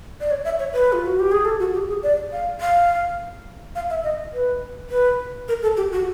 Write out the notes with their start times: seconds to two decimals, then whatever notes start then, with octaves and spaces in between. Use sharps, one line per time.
0.21 D5
0.31 C#5
0.45 E5
0.59 C#5
0.73 B4
0.93 F4
1.06 F#4
1.20 G4
1.32 G#4
1.45 A4
1.60 F#4
1.74 G4
1.88 G#4
2.03 D5
2.32 F5
2.61 F5
3.75 F5
3.90 E5
4.04 D#5
4.34 B4
4.90 B4
5.48 A#4
5.62 A4
5.77 G4
5.92 F#4